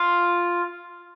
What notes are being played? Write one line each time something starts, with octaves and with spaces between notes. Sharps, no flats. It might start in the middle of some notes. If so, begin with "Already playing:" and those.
Already playing: F4